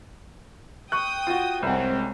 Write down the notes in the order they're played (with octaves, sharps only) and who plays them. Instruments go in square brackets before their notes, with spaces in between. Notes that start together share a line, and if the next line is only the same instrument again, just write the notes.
[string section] G5 D#6 [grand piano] C#6 F#6
[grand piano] F4 F#4
[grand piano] C2 F#5 [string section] G#3 C4 C#4